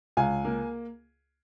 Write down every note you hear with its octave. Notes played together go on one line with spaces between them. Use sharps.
C#2 F5 G#5
A#3